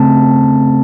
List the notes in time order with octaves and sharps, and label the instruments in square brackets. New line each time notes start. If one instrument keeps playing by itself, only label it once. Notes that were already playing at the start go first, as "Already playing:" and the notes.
Already playing: [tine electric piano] C#3 A3 C4 A5